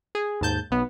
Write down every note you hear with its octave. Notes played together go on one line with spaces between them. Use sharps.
G#4
D#2 G#2 A5 G6
B1 B3